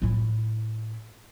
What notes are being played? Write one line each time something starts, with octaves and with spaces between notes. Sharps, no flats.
A2 E4